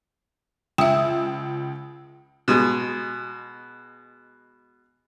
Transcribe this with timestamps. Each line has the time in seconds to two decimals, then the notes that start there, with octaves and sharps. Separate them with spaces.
0.78 C#2 E5 G5 D#6 E6
2.48 B2 G#3